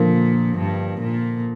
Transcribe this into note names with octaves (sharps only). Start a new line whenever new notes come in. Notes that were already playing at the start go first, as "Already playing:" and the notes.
Already playing: A#2 D3 F3 A#3
G2
A#2